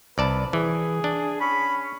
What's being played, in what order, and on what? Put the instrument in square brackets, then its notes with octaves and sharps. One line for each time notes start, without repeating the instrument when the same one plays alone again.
[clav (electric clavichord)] C2 D5 A5 [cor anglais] B4
[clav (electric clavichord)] E3 [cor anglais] G#4
[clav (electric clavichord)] D4
[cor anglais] C#4 [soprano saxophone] B5